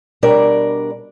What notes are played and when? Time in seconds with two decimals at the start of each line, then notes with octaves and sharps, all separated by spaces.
0.23 B2 G3 D4 A#4 D5